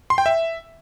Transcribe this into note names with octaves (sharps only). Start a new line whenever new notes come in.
C6
G5
E5